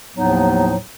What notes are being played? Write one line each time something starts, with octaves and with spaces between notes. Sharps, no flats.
D#2 A2 F3 F#3 B3 D#4